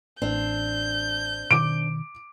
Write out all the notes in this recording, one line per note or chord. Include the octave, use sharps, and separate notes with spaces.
A1 C4 D4 G6
B2 D#3 D6 D7